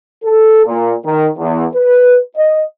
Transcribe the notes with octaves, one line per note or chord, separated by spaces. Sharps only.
A4
A#2
D#3
E2
B4
D#5